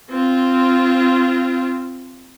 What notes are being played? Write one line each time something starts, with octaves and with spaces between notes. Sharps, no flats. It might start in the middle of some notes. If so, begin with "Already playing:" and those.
C4 F4